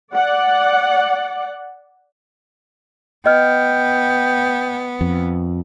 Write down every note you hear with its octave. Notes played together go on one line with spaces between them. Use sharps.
D5 F#5
B3 D#5 G5 F6
F2